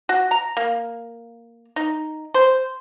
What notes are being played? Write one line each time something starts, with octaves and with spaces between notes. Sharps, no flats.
F#4
A#5
A#3
D#4
C5